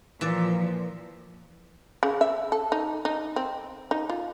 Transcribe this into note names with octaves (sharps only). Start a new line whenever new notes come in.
A#2 E3 F3 D5
C#3
E5
A4
D#4
D#4
C4
D#4
F4